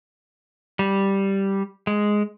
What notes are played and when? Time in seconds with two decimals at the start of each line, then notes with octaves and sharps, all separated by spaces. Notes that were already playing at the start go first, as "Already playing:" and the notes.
0.79 G3
1.87 G#3